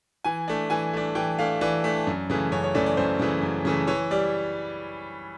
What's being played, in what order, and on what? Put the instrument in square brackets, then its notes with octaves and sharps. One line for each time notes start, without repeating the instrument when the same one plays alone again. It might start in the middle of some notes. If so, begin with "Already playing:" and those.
[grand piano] E3 G#5
A3 D4
E3 G#5
A3 D4
E3 G5
A3 D4 F5
E3 D5
A3 D4
F#2
C#3 E3 A3
F#2 C#5
C#5
C#3 E3 A3 D5
D5
F#2 C5
C#3 E3 A3
F#2
C#3 E3 A3
E3 C#5
G3 D5